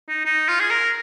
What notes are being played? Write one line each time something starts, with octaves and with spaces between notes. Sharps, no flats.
D#4
D#4
F4
G#4
A#4